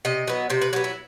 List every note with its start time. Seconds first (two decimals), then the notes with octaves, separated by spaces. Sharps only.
0.05 C3 D#5
0.28 F#3 B3
0.50 C3 C5
0.61 B4
0.73 F#3 B3 G4
0.84 E4